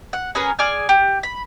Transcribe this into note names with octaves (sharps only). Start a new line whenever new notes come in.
F#5
C#4 G#4 A#4 B4
G#4 D5 G#5 F6
G4
B5